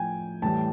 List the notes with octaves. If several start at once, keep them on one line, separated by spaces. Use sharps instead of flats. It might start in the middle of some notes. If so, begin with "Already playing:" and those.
Already playing: A2 F3 G5 G#5
A2 E3 G3 A5